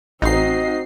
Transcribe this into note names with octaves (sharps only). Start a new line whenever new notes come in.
A1 C4 D#4 F#4 D#5 C7